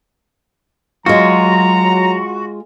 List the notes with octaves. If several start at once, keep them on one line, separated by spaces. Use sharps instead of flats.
F#3 G#3 F4 F#4 A#5